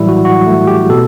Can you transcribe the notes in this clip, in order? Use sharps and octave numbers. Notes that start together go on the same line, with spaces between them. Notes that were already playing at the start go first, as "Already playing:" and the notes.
Already playing: A2 E3 F#3 G3 E4
F#4
F#4
A3
G4
B2 A4